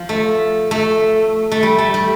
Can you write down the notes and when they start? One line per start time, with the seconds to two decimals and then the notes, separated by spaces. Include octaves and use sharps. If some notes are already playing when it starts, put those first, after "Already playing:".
Already playing: F3
0.09 A3
0.71 A3
1.52 A3
1.63 G3
1.78 A3
1.94 G3